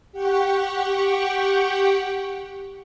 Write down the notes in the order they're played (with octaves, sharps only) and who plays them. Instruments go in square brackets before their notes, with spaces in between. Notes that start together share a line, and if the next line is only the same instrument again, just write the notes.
[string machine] G4 F#5 G5 C#6